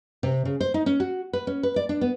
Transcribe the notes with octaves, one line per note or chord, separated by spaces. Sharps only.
C3
C#3
C5
D#4
C#4
F#4
B4
C#4
B4
D5
D4
B3